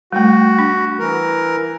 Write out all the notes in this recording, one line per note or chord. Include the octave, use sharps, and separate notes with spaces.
G3 A3 F#4
D4
E3 A#4